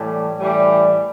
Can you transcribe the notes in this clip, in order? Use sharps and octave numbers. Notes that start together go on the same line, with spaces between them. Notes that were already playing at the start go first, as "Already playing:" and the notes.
Already playing: A2 E3 G3
A2 E3 G3